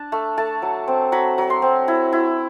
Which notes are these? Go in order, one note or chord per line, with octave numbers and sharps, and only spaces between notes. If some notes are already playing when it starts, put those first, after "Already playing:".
Already playing: D4 A5
A3
A3 A5
F#3
C4
F#3 B5
F#3
C6
C4
E4
E4